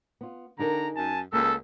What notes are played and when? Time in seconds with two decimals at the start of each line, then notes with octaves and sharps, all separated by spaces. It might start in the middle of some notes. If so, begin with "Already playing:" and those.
0.21 B3 F4
0.59 D3 D#4 G#4 A#4 A#5
0.96 F#2 G#5 A5
1.33 C#2 A#3 A4 E6